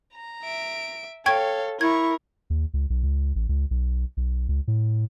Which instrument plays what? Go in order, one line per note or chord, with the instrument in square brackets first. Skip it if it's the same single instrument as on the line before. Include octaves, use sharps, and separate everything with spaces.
[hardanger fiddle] A#5
[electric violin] E5 D7
[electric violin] A4 [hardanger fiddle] C#5 F5 [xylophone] G5 C#6 G#6
[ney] E4 [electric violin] A#4 [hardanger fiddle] C#6 [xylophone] G#6
[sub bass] D#2
C#2
B1
C#2
A1
C#2
B1
B1
C#2
A2